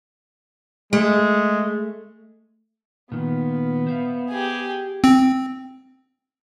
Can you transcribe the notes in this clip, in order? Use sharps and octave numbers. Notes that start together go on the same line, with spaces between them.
G#3 A3
A#2 D#3 B3
C5 E5 F5
G4 G#4
C4